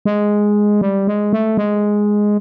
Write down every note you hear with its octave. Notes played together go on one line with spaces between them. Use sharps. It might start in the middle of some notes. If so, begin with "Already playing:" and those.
G#3
G3
G#3
A3
G#3